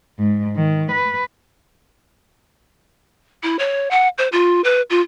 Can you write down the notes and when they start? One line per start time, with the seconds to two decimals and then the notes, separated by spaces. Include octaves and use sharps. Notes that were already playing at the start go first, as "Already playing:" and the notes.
0.19 G#2
0.56 D#3
0.92 B4
3.43 E4
3.59 C#5
3.91 F#5
4.18 C5
4.32 F4
4.64 B4
4.90 F4